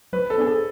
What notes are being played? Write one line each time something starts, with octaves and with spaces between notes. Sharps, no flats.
F#3 B4
A4
B3 D4 G#4
A4